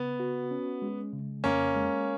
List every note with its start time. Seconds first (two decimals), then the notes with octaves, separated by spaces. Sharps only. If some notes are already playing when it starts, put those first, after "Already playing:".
Already playing: C#3 B3
0.20 F#4
0.51 C#4
0.82 G#3
1.13 C#3
1.44 F2 A#3 C#4
1.75 G#3